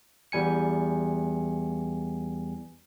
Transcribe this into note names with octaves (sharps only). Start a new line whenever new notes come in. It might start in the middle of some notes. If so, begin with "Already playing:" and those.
E2 G3 G#5 C#7